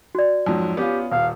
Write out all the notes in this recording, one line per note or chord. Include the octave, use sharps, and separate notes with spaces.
F#4 D5
F2 G#2 F#3
B3 C#4 F4 G4
D#1 F5